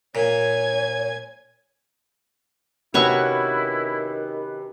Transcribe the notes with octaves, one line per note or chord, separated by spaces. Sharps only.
A#2 C#5 G#5 G#6
C3 D#3 C#4 E4 F#4 B4 C#6 E6